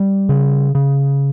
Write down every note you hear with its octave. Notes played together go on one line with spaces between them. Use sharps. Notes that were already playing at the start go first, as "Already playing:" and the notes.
Already playing: G3
C#3
C#3